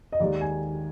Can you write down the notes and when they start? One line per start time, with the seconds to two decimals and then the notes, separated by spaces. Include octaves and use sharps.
0.12 D#5
0.20 D#2 D#3 G#3 D5
0.41 G#5